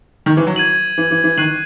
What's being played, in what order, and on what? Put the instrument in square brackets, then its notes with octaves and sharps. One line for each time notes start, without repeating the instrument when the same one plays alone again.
[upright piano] D#3
E3
F#3
[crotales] G#6 D#7 F#7
[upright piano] E3
E3
E3
[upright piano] D#3 [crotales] F#6 C7 D#7 F#7